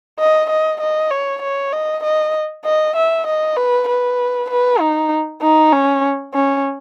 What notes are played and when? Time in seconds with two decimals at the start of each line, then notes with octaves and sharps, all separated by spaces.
0.19 D#5
0.50 D#5
0.80 D#5
1.11 C#5
1.42 C#5
1.72 D#5
2.03 D#5
2.65 D#5
2.96 E5
3.26 D#5
3.57 B4
3.88 B4
4.50 B4
4.80 D#4
5.41 D#4
5.72 C#4
6.34 C#4